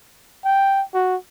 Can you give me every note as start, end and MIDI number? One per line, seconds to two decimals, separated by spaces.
0.45 0.83 79
0.94 1.16 66